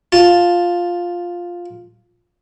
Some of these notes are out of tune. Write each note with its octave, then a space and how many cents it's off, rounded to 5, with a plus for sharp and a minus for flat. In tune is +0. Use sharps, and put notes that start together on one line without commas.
F4 +5 A5 +0